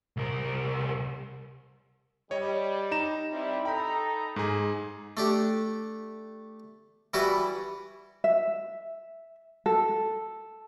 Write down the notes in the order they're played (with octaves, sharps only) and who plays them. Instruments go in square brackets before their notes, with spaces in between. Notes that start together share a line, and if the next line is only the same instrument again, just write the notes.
[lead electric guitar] C2 A#4
[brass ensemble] G3 [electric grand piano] C#5 D#5
[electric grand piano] D#4 A#5 E7
[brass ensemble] G3 C4 E4
[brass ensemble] D#4 A4 A#5 [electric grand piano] G5 B5
[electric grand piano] G#2 G#4
[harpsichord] A3 D4 G4
E3 G3 E4 F#4 B4 D5
[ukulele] E5
A4